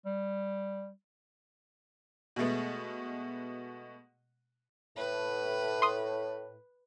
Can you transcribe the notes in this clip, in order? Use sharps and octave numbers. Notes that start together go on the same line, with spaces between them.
G3
B2 G#3 A3 B3
A2 B4
C6 D#6